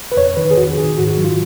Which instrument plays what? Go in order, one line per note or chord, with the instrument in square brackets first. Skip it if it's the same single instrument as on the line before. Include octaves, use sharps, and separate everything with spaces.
[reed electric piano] B4
F2 C#5
D#3 B4
G#4
F2 F#4
D#3 G#4
G#2 F#4
F#4
F#3
F4